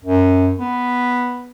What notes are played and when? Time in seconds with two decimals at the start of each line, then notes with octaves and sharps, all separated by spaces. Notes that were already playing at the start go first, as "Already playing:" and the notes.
0.05 F#2
0.60 B3